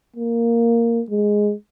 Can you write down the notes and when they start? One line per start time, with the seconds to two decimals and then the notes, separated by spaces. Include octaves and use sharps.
0.16 A#3
1.10 G#3